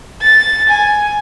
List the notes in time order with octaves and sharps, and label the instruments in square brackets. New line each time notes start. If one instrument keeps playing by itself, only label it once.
[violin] A6
G#5